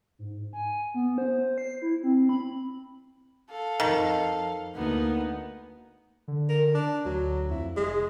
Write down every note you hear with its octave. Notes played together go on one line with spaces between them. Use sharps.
G#2
G#5
B3
C5
C7
E4
C4
B5
A4 F5
F2 D#3
D2 A#3 B3 D#4
D3
A#4
D4
D2 F#3
F2 E4
F1 G#3